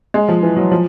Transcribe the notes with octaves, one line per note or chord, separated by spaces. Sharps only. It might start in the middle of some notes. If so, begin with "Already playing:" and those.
G#3
F3
E3
F#3
F3